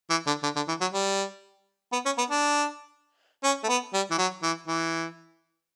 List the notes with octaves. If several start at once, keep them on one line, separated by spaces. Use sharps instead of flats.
E3
D3
D3
D3
E3
F#3
G3
B3
C#4
B3
D4
C#4
A3
B3
G3
E3
F#3
E3
E3